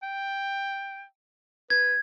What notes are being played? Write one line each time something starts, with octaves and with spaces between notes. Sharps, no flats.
G5
B4 G#6